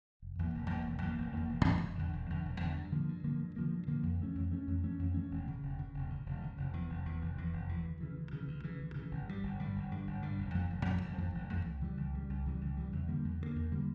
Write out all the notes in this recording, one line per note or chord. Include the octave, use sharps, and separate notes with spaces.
F1
E2 E3 A#3
F1
E2 E3 A#3
F1
E2 E3 A#3
F1
E2 E3 A#3
E1
E2 D3
E1
E2 D3
E1
E2 D3
E1
E2 D3
G2
D3 F3 A#3
G2
D3 F3 A#3
G2
D3 F3 A#3
G2
D3 F3 A#3
F2
E3 A3 C#4
F2
E3 A3 C#4
F2
E3 A3 C#4
F2
E3 A3 C#4
E1
D2 C#3
E1
D2 C#3
E1
D2 C#3
E1
D2 C#3
F1
E2 E3
F1
E2 E3
F1
E2 E3
F1
E2 E3
D2
C#3 E3
D2
C#3 E3
D2
C#3 E3
D2
C#3 E3
G1
G2 D3 G3
G1
G2 D3 G3
G1
G2 D3 G3
G1
G2 D3 G3
F1
F2 E3 A3
F1
F2 E3 A3
F1
F2 E3 A3
F1
F2 E3 A3
C#2
C#3 E3 G3
C#2
C#3 E3 G3
C#2
C#3 E3 G3
C#2
C#3 E3 G3
E2
D3 G3 A#3
E2
D3 G3 A#3
E2
D3 G3 A#3